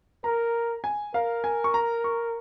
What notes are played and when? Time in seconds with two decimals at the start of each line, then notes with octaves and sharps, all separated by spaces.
0.24 A#4 A#5
0.84 G#5
1.14 A#4 F5
1.44 G#5
1.64 C#6
1.74 A#5
2.04 C#6